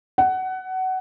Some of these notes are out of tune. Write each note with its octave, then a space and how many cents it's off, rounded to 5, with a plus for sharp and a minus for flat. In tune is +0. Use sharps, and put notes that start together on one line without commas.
F#5 +20